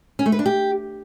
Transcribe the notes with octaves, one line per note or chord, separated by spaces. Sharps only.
C#4
A3
B4
D4
G4